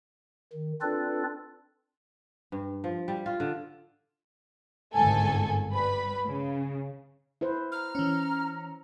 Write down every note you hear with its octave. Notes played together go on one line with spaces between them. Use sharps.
D#3
C4 D4 F4 A4 B4 D5
G2
F3
G3
F4
D3
G1 C2 G#2 D#3 A4 G#5
G3 B4 B5
C#3
E4 B4 C5
A#5 F6
E3 C#4